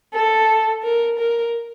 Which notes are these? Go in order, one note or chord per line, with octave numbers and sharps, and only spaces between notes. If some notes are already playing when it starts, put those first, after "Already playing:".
A4
A#4
A#4